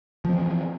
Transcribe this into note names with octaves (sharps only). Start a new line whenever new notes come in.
E3 F3 C4